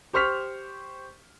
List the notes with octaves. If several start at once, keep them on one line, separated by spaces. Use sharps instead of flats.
G4 C5 C#6 F6 B6 F7